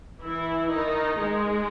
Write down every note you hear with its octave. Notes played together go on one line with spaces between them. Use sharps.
E3 E4
D#3 D#4
G#3